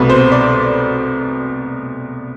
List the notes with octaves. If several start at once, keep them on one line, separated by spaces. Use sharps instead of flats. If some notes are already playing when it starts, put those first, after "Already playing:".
Already playing: C2 B2 A3 B4
C5
D5